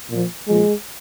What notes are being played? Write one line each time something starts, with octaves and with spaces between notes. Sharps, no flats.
A#2 F3
A#2 F3 G#3